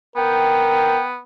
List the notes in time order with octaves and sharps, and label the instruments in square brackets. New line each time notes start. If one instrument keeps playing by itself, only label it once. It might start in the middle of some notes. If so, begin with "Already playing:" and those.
[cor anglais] B3 [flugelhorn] A#4 [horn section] G5